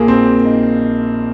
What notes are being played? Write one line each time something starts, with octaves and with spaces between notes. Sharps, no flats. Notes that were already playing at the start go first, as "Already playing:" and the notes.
Already playing: A#1 A#2 A#3 G#4
C4
D#4